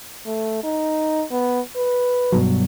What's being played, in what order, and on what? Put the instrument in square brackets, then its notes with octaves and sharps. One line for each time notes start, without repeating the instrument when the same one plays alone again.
[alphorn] A3
D#4
B3
B4
[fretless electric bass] G2 B2 F#3